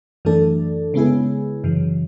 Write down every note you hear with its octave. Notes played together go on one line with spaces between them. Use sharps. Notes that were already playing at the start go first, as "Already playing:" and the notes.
F#2 E3 A3 D4 A4
C#3 G#3 B3 E4 G#4
F#2 C#3 E3